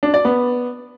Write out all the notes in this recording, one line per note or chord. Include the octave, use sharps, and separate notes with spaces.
D4
D5
B3